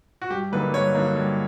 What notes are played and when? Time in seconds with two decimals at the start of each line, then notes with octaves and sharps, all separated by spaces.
0.22 F#4
0.30 G2 G4
0.52 D3 F#3 A#3 D#4 B4
0.73 G2 C#5
0.94 D3 F#3 A#3 D#4
1.16 G2